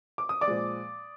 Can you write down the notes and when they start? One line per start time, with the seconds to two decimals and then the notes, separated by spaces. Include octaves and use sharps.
0.18 D6
0.29 D#6
0.41 D5 D6
0.48 A#2 F3 G#3